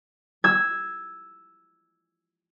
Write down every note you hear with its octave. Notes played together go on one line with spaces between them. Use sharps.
E6 G#6